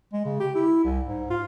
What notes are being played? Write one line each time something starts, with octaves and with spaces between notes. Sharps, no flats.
G#3
C#3
G4
E4
C2
G#2
F4